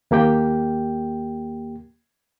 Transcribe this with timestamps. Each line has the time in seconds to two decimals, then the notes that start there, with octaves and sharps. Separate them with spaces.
0.11 D#2 A#3 G4 G5